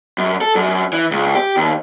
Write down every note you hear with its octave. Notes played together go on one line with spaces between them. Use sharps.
F#2
A4
F#2
E3
C#2
G4
D#2